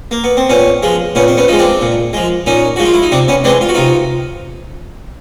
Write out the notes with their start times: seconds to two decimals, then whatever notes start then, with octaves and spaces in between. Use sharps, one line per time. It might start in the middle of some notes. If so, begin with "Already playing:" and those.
0.11 A#3
0.24 B3
0.37 C4
0.50 A#2 B3 C#4
0.83 F3 G#3
1.15 A#2 B3 C#4
1.28 C4
1.37 B3 C#4
1.48 F3 G#3 D#4
1.59 C4 D4
1.82 A#2
2.13 F3 G#3
2.46 A#2 C#4 D#4
2.76 F3 G#3 F#4
2.86 F4
2.94 E4
3.02 D#4
3.12 C3 C4 D4
3.28 B3 C#4
3.44 E3 G#3 C4 D4
3.61 F4
3.69 F#4
3.75 C3 D#4 F4